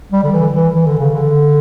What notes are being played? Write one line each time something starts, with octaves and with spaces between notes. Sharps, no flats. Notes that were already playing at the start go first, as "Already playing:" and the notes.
G3
D3
E3
E3
E3
D3
C#3
D3